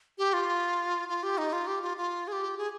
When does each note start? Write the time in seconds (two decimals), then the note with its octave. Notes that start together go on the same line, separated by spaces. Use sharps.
0.18 G4
0.33 F4
1.09 F4
1.23 G4
1.38 D#4
1.53 F4
1.67 G4
1.82 F4
1.97 F4
2.28 G#4
2.32 G4
2.58 G#4